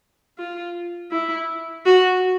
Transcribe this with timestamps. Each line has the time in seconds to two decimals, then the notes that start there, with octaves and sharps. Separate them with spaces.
0.38 F4
1.11 E4
1.86 F#4